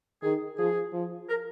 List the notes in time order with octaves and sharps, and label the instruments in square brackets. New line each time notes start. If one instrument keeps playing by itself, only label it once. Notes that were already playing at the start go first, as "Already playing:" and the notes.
[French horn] D#3 [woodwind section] G#4
[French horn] F3 [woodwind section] G#4
[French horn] F3
[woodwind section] A#4